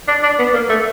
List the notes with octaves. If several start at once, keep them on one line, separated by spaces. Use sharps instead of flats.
D4
D4
B3
A#3
A3